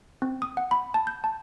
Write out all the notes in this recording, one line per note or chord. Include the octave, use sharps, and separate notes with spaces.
C4
D#6
F#5
B5
A5
G6
A5